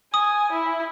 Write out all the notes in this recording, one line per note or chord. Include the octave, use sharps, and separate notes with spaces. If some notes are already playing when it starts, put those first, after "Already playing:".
G#5 D#6
E4